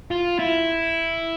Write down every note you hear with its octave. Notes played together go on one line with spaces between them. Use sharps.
F4
E4